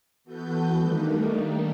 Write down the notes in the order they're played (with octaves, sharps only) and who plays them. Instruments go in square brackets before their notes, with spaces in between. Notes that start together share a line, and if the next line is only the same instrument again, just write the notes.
[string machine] E3 B3 F#4 A4 B4 G6
D#3 G3 A3 A#3 D4 D#4